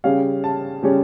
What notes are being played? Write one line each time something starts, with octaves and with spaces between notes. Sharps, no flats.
C#3 G3 C#4 F5
A5
C#3 G3 C#4